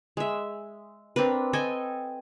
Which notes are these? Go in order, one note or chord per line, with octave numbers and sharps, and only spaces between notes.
G#3 E5
C4 D4 A#4 B4
A4 D#5 G5 G#5